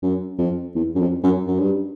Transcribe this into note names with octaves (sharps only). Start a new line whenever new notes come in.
F#2
F2
E2
F#2
F2
F#2
F#2
G2